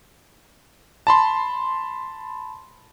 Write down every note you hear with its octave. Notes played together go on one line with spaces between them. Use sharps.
A5 B5 C6